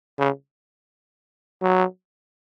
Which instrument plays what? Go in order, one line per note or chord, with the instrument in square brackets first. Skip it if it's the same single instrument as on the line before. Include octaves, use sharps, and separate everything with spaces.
[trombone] C#3
F#3